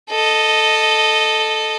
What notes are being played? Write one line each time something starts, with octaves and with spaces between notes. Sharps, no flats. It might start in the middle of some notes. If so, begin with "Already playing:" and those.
A4 D#5